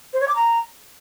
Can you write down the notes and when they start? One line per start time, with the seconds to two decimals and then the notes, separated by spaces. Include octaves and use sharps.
0.13 C5
0.21 C#5
0.28 D6
0.36 A#5